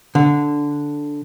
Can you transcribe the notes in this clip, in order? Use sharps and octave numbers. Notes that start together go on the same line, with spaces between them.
D3